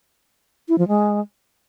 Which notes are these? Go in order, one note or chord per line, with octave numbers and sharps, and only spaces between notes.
E4
F3
G#3